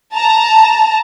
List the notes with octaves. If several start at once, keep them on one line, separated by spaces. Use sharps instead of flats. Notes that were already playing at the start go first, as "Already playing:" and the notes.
A5 A#5